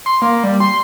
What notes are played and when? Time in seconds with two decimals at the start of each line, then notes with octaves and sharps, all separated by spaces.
0.06 C6
0.22 A#3
0.44 G3
0.60 C6